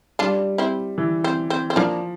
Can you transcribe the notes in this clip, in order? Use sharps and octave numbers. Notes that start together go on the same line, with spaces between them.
G3 D4 F4
C4 E4
E3
C4
C4
C4
F3 A#3 D4